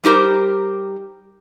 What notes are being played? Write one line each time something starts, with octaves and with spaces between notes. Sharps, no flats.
G3 D#4 G4 A#4 C5